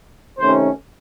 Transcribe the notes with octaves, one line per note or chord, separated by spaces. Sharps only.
C3 D#3 A3 C#4 C5